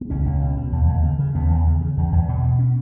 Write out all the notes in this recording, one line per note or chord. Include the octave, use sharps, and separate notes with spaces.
B3
C#2 C#4
C#2
B2
B2
D#2
D#2
C#3
C#3
D#2 B3
D#2
C#3
C#3
E2
E2
B2
B2
C#4